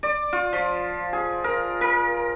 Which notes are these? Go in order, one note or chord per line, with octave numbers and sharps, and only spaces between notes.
D5
F4
F3
G#4
A#4
A#4